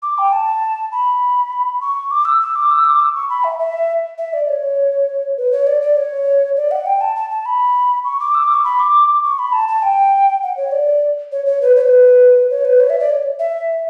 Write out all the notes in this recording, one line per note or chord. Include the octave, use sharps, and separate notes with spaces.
D6
G5
A5
B5
C#6
D6
E6
E6
D6
E6
D6
E6
C#6
B5
E5
E5
E5
D5
C#5
B4
C#5
D5
D5
C#5
D5
F#5
G5
A5
A5
A5
B5
C#6
D6
E6
D6
C#6
B5
D6
C#6
B5
A5
A5
G5
F#5
C#5
D5
C#5
C#5
B4
C#5
B4
C#5
B4
C#5
E5
D5
C#5
E5